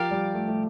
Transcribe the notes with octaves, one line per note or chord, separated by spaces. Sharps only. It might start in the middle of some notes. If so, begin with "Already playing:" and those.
Already playing: F3 G4 A#4 D5 F5
G3
A3
A3